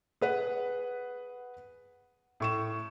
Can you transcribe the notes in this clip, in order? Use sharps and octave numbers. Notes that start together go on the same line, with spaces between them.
G#4 B4 F#5
A2 C#6 E7